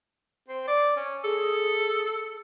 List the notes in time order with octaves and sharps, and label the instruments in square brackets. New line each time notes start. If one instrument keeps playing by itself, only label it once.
[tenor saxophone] C4
D5
C#4
[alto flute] G#4 [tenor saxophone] A4